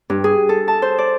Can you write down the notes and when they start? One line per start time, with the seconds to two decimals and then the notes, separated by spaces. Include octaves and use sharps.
0.10 G2
0.24 G#4
0.49 A4
0.68 A5
0.82 C5
0.98 D5